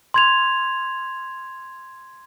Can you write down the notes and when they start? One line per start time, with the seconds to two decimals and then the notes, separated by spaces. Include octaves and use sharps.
0.14 C6 G#6 F7